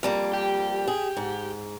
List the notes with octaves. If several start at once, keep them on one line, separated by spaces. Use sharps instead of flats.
F2 G3 A#3
G4
G#4
G#2